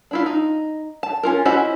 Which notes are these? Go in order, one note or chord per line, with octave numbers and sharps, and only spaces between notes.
D4 E4 F4
D#4
A5
C#4 F4 A#4
C#4 E4 F#4 C5 D#5